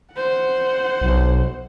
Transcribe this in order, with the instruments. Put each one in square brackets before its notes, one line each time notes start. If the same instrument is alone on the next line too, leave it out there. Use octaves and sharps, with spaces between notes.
[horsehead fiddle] C5 F#5
[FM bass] B1